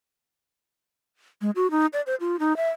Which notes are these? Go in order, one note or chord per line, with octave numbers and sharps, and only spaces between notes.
G#3
F#4
D#4
D5
C5
F4
D#4
E5